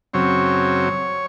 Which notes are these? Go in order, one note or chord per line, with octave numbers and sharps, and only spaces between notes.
F#2 C#3 F#3 C4 C#5